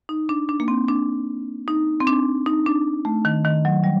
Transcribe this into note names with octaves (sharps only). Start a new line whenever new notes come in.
D#4
D4
D4
A#3
C4
D4
D#4
C4
D4
D#4
D4
A3
D#3
D#3
F#3
G3